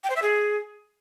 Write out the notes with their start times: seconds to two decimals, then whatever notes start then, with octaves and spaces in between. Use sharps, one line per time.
0.04 G5
0.10 C5
0.16 E5
0.22 G#4